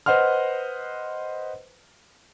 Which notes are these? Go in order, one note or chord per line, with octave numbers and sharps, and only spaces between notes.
B4 C5 D#5 F#5 C6 F6